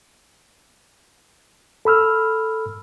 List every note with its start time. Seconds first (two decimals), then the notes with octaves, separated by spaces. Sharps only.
1.85 A4 B5 E6 F6